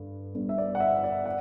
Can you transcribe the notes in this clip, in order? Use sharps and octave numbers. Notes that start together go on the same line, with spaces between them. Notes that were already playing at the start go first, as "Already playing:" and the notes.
Already playing: G2 D3
G1 G2 D3
E5
D5
F#5
E5
D5
F#5